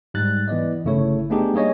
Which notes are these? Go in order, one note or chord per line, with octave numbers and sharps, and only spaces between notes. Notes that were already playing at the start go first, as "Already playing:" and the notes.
G#2 G3 F#6 A6
E3 B3 D5 D#5
G1 C#3 A3 E4 C#5
A3 B3 D4 D#4 G4 G#4
G3 A#3 G#4 C#5 D#5